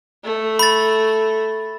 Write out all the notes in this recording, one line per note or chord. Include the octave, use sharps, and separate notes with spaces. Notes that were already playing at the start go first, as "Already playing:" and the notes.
A3
B5 A6